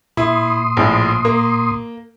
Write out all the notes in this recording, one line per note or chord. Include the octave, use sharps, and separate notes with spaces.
A#2 E4 C6 D#6
A#1 A2 F3
A#3